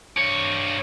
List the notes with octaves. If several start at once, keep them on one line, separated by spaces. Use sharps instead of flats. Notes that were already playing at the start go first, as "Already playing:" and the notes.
G2 C#5